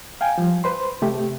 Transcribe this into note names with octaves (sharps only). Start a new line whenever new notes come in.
F5 G5 G#5
F3 G3
B4 C5 C6
C3 A3 G4